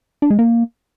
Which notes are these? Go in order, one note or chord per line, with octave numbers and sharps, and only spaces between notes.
D4
G#3
A#3